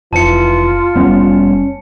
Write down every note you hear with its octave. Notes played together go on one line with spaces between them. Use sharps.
F1 E3 F4 A5 C#7
F1 G3 B3 C#4